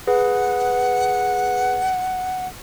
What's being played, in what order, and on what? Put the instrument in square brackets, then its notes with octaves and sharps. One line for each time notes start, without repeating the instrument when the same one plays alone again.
[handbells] G#4 B4 [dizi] F#5